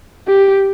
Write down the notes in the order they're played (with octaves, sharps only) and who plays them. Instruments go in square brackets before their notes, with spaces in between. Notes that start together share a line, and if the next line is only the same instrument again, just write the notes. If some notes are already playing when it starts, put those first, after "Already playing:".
[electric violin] G4